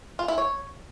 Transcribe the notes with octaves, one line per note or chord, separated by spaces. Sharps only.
F4
E4
C#5